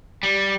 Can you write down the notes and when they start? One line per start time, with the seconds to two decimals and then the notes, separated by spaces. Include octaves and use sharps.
0.23 G3